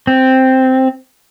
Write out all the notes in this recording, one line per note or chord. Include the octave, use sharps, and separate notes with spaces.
C4